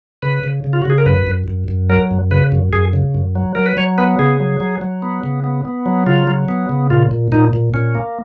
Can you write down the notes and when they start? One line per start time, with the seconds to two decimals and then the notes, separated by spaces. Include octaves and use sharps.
0.22 C#3 B4
0.44 C#3
0.64 C#3
0.73 F4
0.82 F#4
0.85 C#3 G#4
0.98 A#4
1.06 F#2 B4
1.27 F#2
1.48 F#2
1.68 F#2
1.90 F#3 A#4
2.11 F#2
2.31 C#3 B4
2.52 F#2
2.73 F#2 G#4
2.93 C#3
3.14 F#2
3.35 F#3
3.55 F#3 A#4
3.66 B4
3.77 F#3 C#5
3.98 B3 B4
4.19 C#3 G#4
4.40 F#3
4.60 F#3
4.81 F#3
5.02 B3
5.24 C#3
5.44 B3
5.65 B3
5.86 F#3
6.06 C#3 F4
6.27 F#3
6.48 B3
6.69 C#3
6.90 A#2 F4
7.11 A#2
7.32 A#2 D#4
7.53 A#2
7.74 A#2 C#4
7.95 A#3